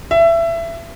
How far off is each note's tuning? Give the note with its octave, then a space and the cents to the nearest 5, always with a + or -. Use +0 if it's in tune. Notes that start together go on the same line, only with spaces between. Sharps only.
E5 +20